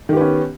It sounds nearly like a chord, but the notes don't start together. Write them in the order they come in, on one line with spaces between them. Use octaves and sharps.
D#3 G4 B3 C#4